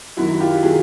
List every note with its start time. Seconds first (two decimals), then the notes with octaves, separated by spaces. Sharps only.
0.17 F#2 D#3 F#3 E4 F#4
0.40 F4 G4
0.63 D#3 F#3 F#4 G#4